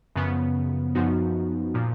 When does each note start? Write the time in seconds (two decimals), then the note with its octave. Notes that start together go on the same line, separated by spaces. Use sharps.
0.16 F#2 C#3 F3 B3
0.95 F#2 F3 B3 D#4 F#4
1.74 A#2 F3